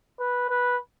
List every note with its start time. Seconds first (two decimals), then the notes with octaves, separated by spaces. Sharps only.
0.20 B4
0.50 B4